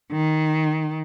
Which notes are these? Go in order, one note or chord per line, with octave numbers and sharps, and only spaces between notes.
D#3